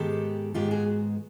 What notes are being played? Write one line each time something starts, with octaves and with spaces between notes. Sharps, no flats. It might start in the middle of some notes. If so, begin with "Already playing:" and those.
Already playing: G#2 D#3 G#3 B3 G4 A4
G#2 D#3 G#3 B3 F4 G4
F#4 G#4